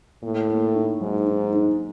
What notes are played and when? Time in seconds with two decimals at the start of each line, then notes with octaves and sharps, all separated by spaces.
0.23 A2 A#3
0.49 A#3
0.75 D#4
1.01 G#2 F#3
1.26 D#4
1.53 D#4